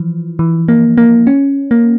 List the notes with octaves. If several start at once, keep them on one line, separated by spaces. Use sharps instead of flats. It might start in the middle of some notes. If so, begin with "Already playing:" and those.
Already playing: E3 F3
E3
A#3
A#3
C#4
A#3